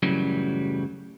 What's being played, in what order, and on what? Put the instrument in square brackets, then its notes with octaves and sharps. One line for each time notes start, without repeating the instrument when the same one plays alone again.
[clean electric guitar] F#2 A2 C#3 E3 F#3 G3